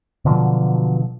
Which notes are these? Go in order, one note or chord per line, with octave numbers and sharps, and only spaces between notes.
B2 D3 F3 F#3